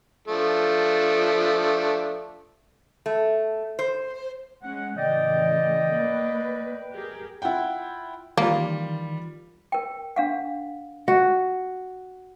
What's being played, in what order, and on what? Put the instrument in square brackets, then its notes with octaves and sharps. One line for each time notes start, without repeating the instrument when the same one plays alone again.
[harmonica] F3 A3 D4
[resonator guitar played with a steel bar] A3
C5
[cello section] G#3 C#4 [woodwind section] F#5
[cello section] A2 C#3 E3 [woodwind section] D5 D#5 G5
[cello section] A#3 B4
G4 G#4 A#4
[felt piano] E4 F4 F#5 G5
[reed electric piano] D#3 E3 [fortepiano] G3 F4 [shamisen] A#3
[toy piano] A#4 G5
D4 F5 F#5
[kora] F#4